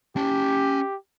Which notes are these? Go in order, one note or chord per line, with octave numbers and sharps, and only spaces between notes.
C#4 G4 A5